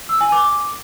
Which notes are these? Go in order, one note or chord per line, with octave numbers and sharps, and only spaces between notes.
E6
G#5
D6